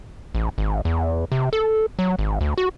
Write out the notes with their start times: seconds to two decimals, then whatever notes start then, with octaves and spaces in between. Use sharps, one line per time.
0.35 A1
0.58 G#1
0.85 E2
1.32 C3
1.53 A4
1.99 F#3
2.19 G#1
2.41 D2
2.58 F#4